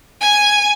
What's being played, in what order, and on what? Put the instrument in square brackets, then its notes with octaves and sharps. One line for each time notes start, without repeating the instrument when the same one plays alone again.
[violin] G#5